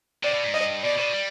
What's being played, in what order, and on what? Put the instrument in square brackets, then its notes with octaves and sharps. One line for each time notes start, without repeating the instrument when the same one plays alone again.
[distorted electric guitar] C3 [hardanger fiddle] D5
[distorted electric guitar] B2
G#2
[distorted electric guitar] G2 [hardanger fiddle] D#5
[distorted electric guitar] B2 [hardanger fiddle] D5
[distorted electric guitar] B2
G3